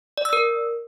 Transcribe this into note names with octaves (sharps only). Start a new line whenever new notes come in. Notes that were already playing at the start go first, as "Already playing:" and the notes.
D5
E6
A#4